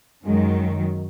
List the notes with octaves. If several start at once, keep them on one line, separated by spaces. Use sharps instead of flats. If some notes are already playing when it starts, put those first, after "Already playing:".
F#2 D#3 F#3 G#3